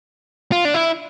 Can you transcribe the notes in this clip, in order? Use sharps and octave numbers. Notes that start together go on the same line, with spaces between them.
F4
D4
E4